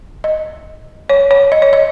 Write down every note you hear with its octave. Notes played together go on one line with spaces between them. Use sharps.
D#5
C#5
C#5
D#5
C#5
D#5